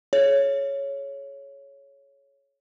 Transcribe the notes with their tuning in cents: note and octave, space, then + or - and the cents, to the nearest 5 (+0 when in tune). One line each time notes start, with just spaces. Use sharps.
G#4 +45 C#5 +0